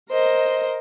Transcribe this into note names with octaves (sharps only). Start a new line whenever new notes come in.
A#4 C5 D#5